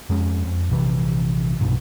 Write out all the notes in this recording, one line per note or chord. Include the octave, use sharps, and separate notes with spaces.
F2 G#3 C#4
F2
A#1 C3 E3
B1 G2 B2